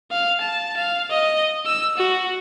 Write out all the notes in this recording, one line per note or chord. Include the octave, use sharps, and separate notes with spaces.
F5
A5
F5
D#5
E6
F#4